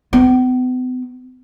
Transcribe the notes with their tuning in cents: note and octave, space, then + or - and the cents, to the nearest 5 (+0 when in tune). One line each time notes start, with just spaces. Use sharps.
B3 +45